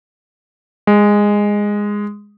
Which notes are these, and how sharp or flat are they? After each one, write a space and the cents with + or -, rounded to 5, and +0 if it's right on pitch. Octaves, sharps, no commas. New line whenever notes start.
G#3 -10